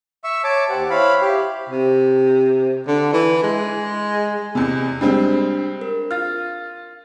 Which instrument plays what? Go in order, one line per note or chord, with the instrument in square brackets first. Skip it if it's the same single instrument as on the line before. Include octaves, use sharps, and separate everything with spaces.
[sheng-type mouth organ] E5 C#6 E6
C#5 A5 D6
[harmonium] D#2 G4 C5 [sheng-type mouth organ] F#5
[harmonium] E4 C5 C#5 [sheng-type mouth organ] F5 B5
[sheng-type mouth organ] G4
[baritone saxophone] C3
D3
E3
G#3
[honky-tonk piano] E2 C3
[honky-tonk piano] G3 G#3 C4 [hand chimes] D4
[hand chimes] A#4
[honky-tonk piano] F4 [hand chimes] F6 A6